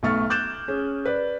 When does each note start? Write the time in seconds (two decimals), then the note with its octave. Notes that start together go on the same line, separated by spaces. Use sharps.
0.03 B1 B2 A3 C#6 F6 A6
0.30 D6 F#6 G6 A6 E7
0.68 C#4 G#4
1.05 B4 D5